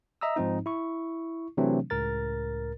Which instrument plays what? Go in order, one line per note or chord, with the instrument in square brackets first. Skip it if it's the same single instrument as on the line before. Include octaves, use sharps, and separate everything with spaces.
[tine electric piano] D#5 E5 A#5 D#6 E6
G#2 F3 C4 D#4
E4 C#6
C3 E3 F#3 A3 C4 D4
C#2 A2 A#4 A6